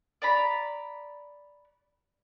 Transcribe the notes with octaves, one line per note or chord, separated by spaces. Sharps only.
D5 A#5 B5